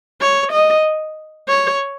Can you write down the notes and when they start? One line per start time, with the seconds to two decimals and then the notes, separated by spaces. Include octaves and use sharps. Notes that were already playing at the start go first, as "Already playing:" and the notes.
0.21 C#5
0.52 D#5
1.48 C#5